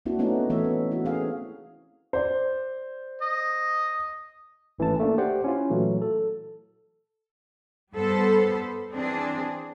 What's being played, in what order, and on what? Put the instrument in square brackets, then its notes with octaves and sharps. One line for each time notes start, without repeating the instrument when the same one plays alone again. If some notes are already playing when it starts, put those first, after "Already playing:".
[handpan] A#3 C4 D4 E4 F#4
A3 B3 C#4 D#4 F#4
E3 A3 B3 C#5 E5
C#4
E4 F#4
C4 C#4 G#4 F5
[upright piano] C5 D5
[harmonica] D#5
[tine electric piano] G#1 E3 A3 C#4 A5
A3 A#3 D4
G4 C5 D5 F#5
C#4 E4 F4
A#2 E3 F#3 A3
A4
[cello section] G2 G3 B3 A4 C5
E3 C4 D4 G#4